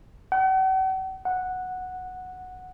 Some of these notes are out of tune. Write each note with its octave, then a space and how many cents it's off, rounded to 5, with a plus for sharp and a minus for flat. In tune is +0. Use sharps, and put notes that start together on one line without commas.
F#5 +45
F#5 -5